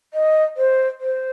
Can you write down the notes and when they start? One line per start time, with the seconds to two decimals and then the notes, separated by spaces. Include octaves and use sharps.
0.14 D#5
0.57 C5
1.01 C5